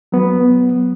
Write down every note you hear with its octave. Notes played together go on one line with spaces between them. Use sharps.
F#3 B3